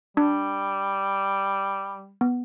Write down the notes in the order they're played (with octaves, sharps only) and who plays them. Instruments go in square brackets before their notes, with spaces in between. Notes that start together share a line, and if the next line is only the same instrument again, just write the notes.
[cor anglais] G3 [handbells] D4
[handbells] B3